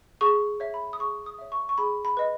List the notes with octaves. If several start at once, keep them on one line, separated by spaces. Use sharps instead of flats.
G#4 C#6
C#5 E5
B5
D#6
G#4 C#6
D#6
C#5 E5
C#6
C#6
G#4 B5
B5
B4 D#5